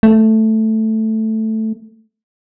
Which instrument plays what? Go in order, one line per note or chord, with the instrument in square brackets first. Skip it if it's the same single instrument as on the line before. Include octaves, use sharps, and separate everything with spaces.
[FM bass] A3